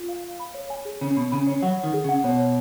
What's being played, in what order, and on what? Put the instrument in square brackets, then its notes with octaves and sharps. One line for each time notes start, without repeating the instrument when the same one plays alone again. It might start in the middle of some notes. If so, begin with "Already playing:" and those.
Already playing: [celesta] F4
F5
F5
B5
C#5
G#5
G#4
[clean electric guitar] C#3 [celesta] C#5
[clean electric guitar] B2 [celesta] B5
[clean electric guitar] C#3 [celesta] B5
[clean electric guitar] C#3 [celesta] C#5
[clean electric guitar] F#3 [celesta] F#5
[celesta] F#5
[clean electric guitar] D#3
[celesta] G#4
[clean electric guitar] C#3
[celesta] F#5
[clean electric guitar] B2 [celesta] C#5
[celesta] C#5